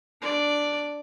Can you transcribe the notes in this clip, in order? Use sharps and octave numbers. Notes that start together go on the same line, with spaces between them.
D4 D5